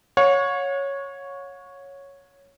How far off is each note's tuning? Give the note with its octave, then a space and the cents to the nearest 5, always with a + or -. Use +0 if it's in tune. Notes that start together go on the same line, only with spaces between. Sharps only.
C#5 +0 F#5 -45